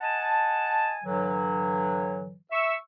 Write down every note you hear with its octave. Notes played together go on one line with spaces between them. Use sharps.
D#5 F#5 G#5 A5
G2 D3 E3 F#3
E5 C#6 E6